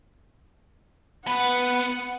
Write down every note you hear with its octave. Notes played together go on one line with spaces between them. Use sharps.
B3 F#5